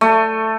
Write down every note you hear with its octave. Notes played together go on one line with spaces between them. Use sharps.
A3